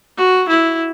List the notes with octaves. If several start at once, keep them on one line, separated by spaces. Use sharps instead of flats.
F#4
E4